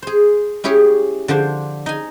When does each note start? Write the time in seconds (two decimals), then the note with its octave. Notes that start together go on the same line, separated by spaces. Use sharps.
0.02 G#4 C5
0.64 C#4 E4 G4 G#4 C#5
1.28 D3 F3 D4 C5
1.86 D#4 G#5